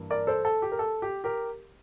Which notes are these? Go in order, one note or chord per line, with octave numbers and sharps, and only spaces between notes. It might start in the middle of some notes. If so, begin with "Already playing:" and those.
Already playing: G2 E3 A#3
A#4 D5
A4 C5
A4
G4
A#4
A4
G4
G4 A#4